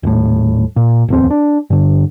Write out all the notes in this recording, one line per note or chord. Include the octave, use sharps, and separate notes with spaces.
D#1 A2
A#2
D1 E2 C4
D4
G2 D3